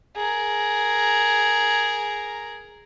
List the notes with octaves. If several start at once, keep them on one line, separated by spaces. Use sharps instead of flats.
G#4 A#4